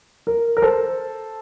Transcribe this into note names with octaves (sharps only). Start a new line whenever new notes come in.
A#4
A#4
A4 C5